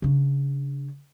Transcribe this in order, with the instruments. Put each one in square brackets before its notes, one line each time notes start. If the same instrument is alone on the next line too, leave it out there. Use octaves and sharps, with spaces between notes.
[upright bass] C#3 D4